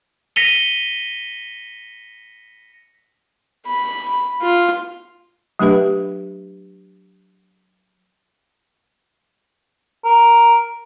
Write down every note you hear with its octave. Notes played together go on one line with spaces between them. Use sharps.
A#6 B6 C#7 D#7 F7 G7
B5
F4
F#3 A3 D4 G4 B4 E5
A#4